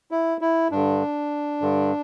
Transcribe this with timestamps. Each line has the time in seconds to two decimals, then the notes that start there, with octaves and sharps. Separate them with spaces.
0.11 E4
0.41 E4
0.71 G2 D3 D4
1.62 G2 D3